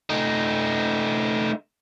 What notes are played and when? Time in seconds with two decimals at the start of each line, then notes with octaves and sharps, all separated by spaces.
0.10 A3 D#4